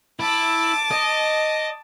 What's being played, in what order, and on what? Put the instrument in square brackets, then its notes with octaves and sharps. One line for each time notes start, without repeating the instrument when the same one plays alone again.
[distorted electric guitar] E4 [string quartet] A5 D6
[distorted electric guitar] D#5